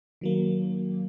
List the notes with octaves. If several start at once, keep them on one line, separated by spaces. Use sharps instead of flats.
D#3 F#3 A#3